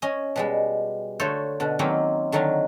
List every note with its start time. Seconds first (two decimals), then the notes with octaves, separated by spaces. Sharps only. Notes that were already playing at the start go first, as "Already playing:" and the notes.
0.02 C#4 D#5 G#5
0.36 B2 G3 G#3
1.20 D3 A3 A4 C5 C#5
1.60 B2 D3
1.79 D#3 F#3 A#3 C4 C#4
2.32 D3 D#3 F#3 E5 F5